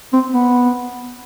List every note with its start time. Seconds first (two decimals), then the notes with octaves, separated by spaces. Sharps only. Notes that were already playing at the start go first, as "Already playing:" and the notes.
0.13 C4
0.34 B3